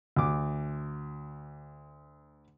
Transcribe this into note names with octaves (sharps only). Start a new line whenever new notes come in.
D2 D6